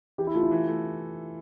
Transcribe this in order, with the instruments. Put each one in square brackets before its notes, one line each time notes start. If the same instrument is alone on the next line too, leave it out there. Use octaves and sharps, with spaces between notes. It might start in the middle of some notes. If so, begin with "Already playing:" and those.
[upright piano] E3 [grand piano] G4
[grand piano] E4
[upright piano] A3 [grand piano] F4
[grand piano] E4
[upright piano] E3
A3